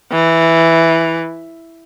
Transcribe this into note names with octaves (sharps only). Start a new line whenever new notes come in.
E3